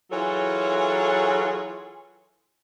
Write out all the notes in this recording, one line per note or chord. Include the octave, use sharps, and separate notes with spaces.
E3 F#3 F4 G#4 A4 C#5